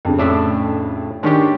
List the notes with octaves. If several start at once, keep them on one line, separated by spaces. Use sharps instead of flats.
F2 C#3
A2 D4 E5
D#3 G#3 C#4 D4 G4